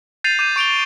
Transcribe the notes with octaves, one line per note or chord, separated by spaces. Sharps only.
G6 A6 C7 D#7 F7
D6 G6 D#7
C#6 D7 F7 G7